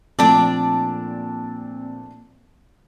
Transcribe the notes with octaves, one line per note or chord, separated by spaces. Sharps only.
A#2 F3 A3 C4 D4 D5 A5 D7